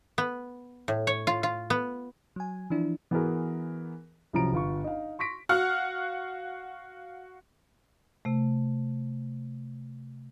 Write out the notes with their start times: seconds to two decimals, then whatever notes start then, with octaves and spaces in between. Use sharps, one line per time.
0.18 B3
0.88 A2
1.07 C#5
1.27 F4
1.43 F4
1.70 B3
2.36 F#3 G#5
2.70 E3 F3 D4 E4
3.11 E3 B3 F#4 G#4 A#4
4.33 C2 C#3 F3 F#3 A#5 D7
4.53 G1 F4 C#6
4.84 D#4 F5
5.19 C6 C#6 A#6 B6 D7
5.49 F#4 F5 F#5 F6
8.25 C3 A3